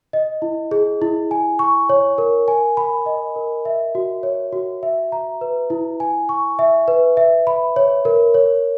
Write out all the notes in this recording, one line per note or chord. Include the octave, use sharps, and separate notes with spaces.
D#5
E4
G#4
E4
G#5
C#6
C#5
A#4
G#5
B5
D#5
A#4
E5
F#4
C#5
F#4
E5
A#5
B4
E4
G#5
C#6
E5
B4
E5
B5
C#5
A#4
C#5